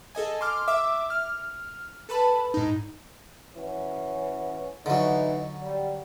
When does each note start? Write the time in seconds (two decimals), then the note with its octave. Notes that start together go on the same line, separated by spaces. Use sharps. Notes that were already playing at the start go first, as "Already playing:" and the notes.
0.15 G#4 A4 D#5 G#5
0.41 C6 D6 F6
0.68 E5 D6 E6
1.10 F6
2.09 A4 B4 A5 B5
2.54 G#2 D#4
3.56 E3 C#4 F#4
4.86 D3 E3 F#3 D#4
5.62 G3